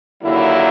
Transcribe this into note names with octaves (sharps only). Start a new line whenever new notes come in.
D#2 D3 F#3 A#3 E4